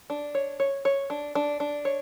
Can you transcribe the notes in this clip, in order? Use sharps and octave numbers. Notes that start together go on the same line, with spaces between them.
D4
C#5
C#5
C#5
D4
D4
D4
C#5